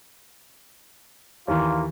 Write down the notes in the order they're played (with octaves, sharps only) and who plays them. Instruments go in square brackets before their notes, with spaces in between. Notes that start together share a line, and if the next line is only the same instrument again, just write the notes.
[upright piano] D#2 E3 [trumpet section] A#3 F4